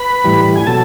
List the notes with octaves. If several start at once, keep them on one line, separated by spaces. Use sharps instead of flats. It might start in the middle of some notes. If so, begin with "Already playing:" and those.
Already playing: B4 B5
A2 E3 G3
G#5
B2 F#3 A4 A5